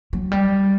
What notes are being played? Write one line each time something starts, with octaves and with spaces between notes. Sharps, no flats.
F#3
G3